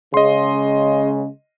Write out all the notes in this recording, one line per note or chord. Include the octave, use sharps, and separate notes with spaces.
C#3 G#3 D#5 C6